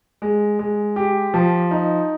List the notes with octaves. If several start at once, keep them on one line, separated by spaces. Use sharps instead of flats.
G#3
G#3
G4
F3
D#4